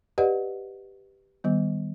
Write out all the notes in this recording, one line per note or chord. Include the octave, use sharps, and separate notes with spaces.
G4 B4 D5 D#5 F#5
D#3 G3 B3